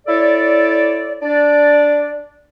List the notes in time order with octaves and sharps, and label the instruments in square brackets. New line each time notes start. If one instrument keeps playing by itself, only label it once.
[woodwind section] E4 A4 C#5 D5
D4 D5